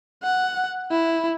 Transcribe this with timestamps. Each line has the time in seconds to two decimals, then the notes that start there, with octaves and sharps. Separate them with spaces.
0.23 F#5
0.91 E4